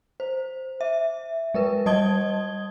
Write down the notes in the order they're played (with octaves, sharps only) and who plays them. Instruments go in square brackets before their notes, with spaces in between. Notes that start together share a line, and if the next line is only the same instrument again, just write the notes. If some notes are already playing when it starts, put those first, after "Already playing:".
[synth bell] C5
E5
G#3 A#4 B4
G3 D#5 A5 D#6 G#6 G7